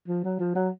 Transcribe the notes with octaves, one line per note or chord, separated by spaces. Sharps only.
F3
F#3
F3
F#3